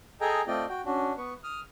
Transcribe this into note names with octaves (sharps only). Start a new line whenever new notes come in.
G#4 A4 D#5 G5 G#5 A#5
A3 C4 F4 D5 D#5 G5
F#4 G5
C#4 D4 F#4
B3 B4 C#6
D#6 F6